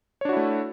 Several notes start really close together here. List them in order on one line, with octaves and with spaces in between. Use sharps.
C#5 D4 F#4 E4 A3